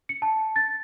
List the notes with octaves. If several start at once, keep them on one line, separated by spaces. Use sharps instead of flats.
C#7
A5
A6